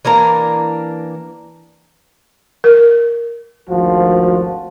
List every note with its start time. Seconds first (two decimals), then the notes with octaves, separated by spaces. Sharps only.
0.05 E3 A#3 D4 A#5
2.64 A#4
3.69 G#1 D2 F3 F#4